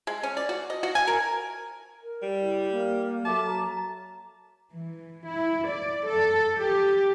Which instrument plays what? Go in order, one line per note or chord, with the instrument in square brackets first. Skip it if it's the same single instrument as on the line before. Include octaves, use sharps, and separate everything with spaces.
[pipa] G#3
C#4
D5
F#4
D#5
F#4
G#5
A#4
[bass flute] A#4
[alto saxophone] G3
[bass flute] E4
A#3
[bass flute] F#3 [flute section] A4 E5 D6 [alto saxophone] A5
[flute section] A#5
[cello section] E3
E4
D5
A4
G4